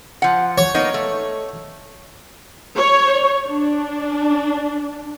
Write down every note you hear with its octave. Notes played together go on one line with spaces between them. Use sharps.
F3 F#5
C#5
A#3 B3 D#4
A3
C#5
D4